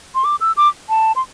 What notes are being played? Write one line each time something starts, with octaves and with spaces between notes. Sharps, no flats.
C6
D6
E6
D6
A5
C6